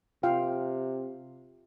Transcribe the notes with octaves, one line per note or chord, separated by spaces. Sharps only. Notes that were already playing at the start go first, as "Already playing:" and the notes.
C3 F4 F5 G5